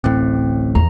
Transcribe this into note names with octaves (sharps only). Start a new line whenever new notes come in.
D1 A1 A2 C4
E2 A#5